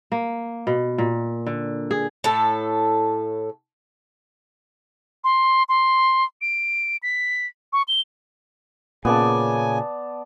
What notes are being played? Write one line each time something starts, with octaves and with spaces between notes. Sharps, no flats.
A#3
B2
A#2
D3
G#4
A2 A4
C6
C6
D7
B6
C#6
G7
A#2 C#3 B3 D5 G#5 A5